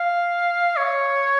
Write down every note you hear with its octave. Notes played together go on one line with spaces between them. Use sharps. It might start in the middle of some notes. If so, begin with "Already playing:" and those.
Already playing: F5
C#5